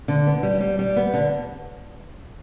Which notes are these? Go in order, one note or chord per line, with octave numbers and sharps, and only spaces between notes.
D3
B3
G3
G3
G3
B3
D3